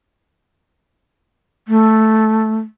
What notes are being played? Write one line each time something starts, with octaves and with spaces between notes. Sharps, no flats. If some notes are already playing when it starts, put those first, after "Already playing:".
A3